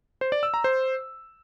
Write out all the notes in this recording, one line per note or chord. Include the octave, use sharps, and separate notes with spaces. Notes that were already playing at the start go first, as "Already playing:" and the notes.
C5
D5
E6
A#5
C5